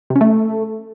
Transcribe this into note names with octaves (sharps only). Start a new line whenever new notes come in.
C3
C#4
A3